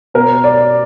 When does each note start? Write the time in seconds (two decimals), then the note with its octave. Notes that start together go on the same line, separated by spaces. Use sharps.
0.14 B2 A#4
0.44 D5